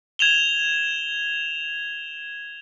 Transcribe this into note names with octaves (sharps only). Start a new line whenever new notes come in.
G#6 E7 F7 G7